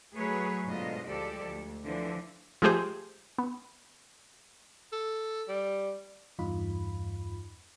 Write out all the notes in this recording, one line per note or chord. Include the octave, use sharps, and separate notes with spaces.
F#3 A3 G#4 B4 C#5
G#2 B2 D3 F4 D#5
D2 F3 G#3 G4 A4 D5
D2
D3 E3 F3
F3 G#3 A3 G4 G#4 C5
B3
A4
G3
E2 G2 D#4 F4 B5